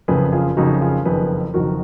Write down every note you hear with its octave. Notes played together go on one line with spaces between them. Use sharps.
F#1 F2 C#3 G#4 B4
F4 G#4
F#1 F2 C#3 D#4 F#4
F4 G#4
F#1 F2 D#3 G#4 B4
F#1 F2 D#3 F#4 A#4